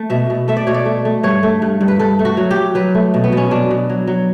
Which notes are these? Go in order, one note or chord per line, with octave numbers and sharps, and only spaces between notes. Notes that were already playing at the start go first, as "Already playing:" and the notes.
Already playing: A3
B2 E5
B2
A3 E5
D5
B2 C#5
D5
A3
A3
G2 C#5
A3
G2
G2
B4
G2 A4
A3
F#4
F#3
G4
F#3
F#3 B4
A3
B2
B3
B2 C#4
B2 D4
B2
F#3
F#3